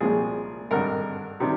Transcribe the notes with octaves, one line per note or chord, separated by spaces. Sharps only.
C2 A#2 F3 G#3 G#4
G#1 G2 D3 A#4
C3 D#3 G3